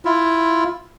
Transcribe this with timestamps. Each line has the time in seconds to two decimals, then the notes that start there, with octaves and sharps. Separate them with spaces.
0.05 E4 F4